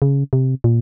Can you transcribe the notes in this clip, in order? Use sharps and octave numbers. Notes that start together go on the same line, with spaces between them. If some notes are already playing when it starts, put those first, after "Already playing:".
C#3
C3
A#2